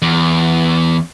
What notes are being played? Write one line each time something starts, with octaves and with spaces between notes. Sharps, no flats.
E2